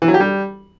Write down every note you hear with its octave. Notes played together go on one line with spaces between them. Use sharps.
E3
F#3
G4
G3